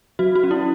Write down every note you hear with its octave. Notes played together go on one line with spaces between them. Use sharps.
F#3 F#4
F#4
C#4
E4